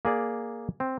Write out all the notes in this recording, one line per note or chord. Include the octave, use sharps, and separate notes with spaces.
A#3 G#4 D5
C4